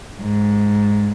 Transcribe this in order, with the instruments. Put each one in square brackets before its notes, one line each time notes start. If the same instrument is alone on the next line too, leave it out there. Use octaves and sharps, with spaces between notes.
[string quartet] G#2